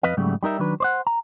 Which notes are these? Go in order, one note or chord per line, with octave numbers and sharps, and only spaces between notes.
F2 B4 D#5 F5
G#2 C#3 F#3 G3 A3
G3 D#4 A#4 E5
D#3 F#3 D4 B4
C5 D5 F#5
A#5